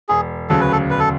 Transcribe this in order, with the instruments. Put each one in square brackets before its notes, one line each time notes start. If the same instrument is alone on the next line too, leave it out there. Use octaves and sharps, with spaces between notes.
[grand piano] E1 [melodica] G#4
[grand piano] D2 C#3 F#3 C#4 [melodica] A4
[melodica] B4
A4
[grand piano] E1 [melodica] B4
[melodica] A4